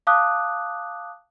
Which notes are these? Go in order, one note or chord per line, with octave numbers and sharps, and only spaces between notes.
F5 A5 D6 D#6 F#6